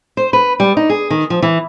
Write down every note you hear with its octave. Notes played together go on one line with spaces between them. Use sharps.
C5
B4
G3
D#4
G#4
D#3
F3
E3